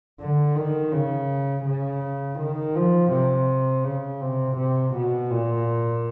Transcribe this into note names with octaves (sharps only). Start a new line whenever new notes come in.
D3
D#3
C#3
C#3
D#3
F3
C3
C#3
C3
C3
B2
A#2